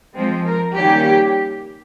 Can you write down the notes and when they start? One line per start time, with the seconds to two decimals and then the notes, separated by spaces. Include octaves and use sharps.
0.14 F3 G#3 C4
0.45 A#4
0.75 D#3 G3 A#3 C#4 G4